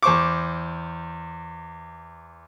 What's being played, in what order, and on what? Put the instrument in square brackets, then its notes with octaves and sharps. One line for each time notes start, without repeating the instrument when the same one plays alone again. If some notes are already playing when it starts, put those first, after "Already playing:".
[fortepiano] E2 C5 C#6 D6